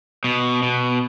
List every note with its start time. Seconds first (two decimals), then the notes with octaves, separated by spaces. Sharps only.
0.24 B2
0.63 B2